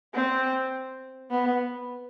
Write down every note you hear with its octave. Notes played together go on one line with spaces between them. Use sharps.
C4
B3